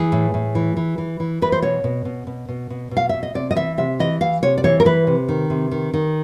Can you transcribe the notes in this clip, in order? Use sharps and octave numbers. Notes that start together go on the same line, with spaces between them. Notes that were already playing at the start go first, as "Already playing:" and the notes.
Already playing: E3 G#4
A2
A2
E3
E3
E3
E3
E3 B4
C5
B2 C#5
B2
B2
B2
B2
B2
B2
F5
B2 E5
D#5
C3 D5
D#5
E3 E5
C3 E5
E3 D#5
E3 F5
C3 C#5
D5
E3 C#5
A#4
E3 B4
C3
D#3
C3
D#3
D#3